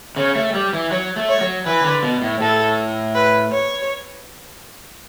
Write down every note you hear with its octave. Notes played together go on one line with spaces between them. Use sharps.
C#3 C#5
A3
G3
E3
F#3 C#5
A3
C#5
F#3
E3 B4
D3
B2
A2
A2 A4
B4
C#5